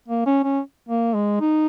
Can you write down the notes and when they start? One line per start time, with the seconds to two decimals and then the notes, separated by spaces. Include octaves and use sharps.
0.08 A#3
0.26 C#4
0.44 C#4
0.89 A#3
1.14 G#3
1.41 D#4